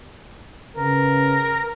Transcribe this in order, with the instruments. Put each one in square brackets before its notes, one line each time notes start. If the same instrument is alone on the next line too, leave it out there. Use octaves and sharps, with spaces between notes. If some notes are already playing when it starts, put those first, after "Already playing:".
[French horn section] C#3 B4 [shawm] A#4